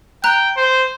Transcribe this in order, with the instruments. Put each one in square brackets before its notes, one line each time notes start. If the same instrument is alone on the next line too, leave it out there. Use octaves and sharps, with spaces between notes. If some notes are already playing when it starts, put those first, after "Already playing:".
[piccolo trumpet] G5 [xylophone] A#5 F#6
[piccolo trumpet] C5